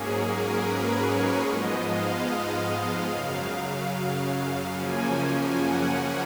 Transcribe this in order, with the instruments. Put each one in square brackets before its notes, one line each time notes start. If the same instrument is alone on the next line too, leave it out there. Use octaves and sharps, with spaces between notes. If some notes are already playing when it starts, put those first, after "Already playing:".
Already playing: [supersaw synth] G#2 F#3 A#3 C#4 G#4
A#4
B4
C#5
G#2 F3 G#3 B3 D#5
F5
F#2 C#3 F#3 F5
F#2 C#3 F3 A#3 C#4 G#5
F#5